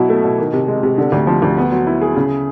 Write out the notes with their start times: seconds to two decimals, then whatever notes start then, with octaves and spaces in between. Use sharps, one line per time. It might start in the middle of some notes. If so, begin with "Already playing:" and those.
Already playing: B2 F#3 E4
0.09 A3
0.24 B2
0.38 D#3
0.53 C3
0.68 G#3
0.83 C3
0.98 D3
1.12 D2
1.27 F3
1.42 D2
1.57 B3
1.72 F#3
1.87 E4
2.01 G#4
2.16 C#3